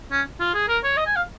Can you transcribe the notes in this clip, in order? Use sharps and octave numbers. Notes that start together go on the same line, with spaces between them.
C#4
F4
G#4
A#4
C#5
D#5
G#5
F5